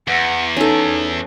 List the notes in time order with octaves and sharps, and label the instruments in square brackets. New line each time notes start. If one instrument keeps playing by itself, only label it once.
[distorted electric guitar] E2 [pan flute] F#5
[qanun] C#4 A4 [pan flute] D#4